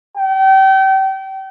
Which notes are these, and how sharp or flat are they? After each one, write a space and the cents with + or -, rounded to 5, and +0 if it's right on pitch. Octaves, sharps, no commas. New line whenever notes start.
G5 -35